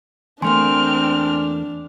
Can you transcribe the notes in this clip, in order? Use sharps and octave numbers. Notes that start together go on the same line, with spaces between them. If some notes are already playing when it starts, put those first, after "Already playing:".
E2 A3 A#3 C4 D4 G#5 C6 F6